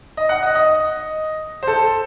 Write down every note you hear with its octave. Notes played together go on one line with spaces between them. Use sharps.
D#5
F#5
D#5
D#5
C5
A4